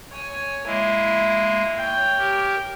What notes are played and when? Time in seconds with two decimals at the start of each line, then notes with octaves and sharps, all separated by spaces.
0.11 C#5 G#5
0.66 G#3 A#3 E4
1.77 C#5 G5
2.18 G4 A#4